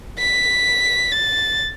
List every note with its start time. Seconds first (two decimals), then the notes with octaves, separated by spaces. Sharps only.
0.18 B6
1.11 A6